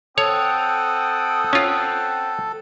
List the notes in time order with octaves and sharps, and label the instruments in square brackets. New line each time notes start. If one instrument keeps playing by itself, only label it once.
[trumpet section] C4 F#5 G5 [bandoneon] A4 [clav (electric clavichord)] C#5 [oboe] D#6
[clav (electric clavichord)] C#4 F4